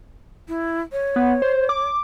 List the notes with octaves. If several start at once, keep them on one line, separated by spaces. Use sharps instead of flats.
E4
C#5
B3
C5
D6